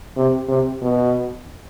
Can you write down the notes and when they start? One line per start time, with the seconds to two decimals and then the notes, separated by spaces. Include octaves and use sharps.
0.16 C3
0.49 C3
0.82 B2